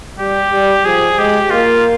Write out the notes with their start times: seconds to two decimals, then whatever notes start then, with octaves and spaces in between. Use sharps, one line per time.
0.18 G3 G4
0.52 G3
0.85 F3 G#4
1.18 G#3 G4
1.50 A#3 F4